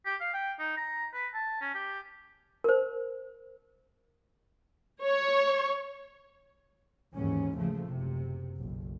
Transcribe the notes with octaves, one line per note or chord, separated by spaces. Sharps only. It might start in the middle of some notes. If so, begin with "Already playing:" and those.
G4
F5
G5
D#4
A#5
B4
A5
C#4
G4
A#4 C5
C#5
D#2 G#2 E3 C#4
C#3 F3 A3
F#1 C3
F#1 B1